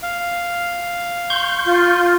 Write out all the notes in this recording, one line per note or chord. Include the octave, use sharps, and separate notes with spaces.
F5
C6 C#6 G6
F4